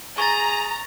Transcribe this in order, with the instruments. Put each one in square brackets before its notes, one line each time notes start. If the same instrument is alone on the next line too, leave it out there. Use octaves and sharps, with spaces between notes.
[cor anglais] G#4 [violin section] A#5 [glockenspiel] C#6 A6